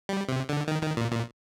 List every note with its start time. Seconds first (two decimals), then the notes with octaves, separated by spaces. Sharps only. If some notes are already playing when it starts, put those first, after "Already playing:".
0.09 G3
0.29 C3
0.49 D3
0.68 D#3
0.83 D#3
0.97 A#2
1.12 A#2